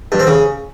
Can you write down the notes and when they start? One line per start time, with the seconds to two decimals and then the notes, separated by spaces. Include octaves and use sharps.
0.12 G2
0.19 C4
0.27 C#3